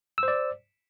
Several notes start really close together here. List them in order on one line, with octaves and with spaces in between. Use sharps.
E6 C5 D5